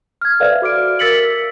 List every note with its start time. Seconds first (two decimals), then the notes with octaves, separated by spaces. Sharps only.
0.21 F6 G#6
0.40 A4 B4 C5 D5 E5 F5
0.62 F#4 D6 F6 D7
0.99 A#4 E6 A6 B6 C#7 F#7